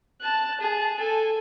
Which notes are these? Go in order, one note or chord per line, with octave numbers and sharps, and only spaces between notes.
A5 F#6
G#4 A5
A4 G#5